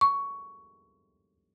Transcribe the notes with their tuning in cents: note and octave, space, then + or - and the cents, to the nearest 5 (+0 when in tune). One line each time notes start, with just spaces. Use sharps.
C#6 +10